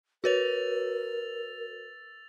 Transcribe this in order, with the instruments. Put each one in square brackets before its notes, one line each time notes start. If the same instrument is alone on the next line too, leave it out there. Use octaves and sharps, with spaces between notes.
[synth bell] F#4 B4 C#5 [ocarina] A#4 [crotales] E6 A6 F7